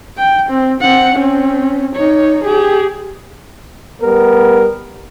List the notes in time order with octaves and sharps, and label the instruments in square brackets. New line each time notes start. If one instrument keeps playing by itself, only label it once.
[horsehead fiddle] G5
C4
C4 F#5
C4 C#4
D#4 C#5
G4 G#4
[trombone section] G3 B3 A#4